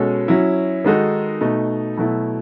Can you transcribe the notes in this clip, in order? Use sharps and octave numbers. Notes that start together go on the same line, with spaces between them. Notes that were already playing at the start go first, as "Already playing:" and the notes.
Already playing: B2 G#3 C#4 F#4 A4
F#3 C#4 E4
D#3 G#3 D#4 F#4 A4
B2 A3 D#4
B2 F#3 A3 E4